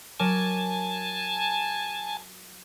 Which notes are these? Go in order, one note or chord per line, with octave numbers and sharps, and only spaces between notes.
F#3 A#4 G#5 A5 D6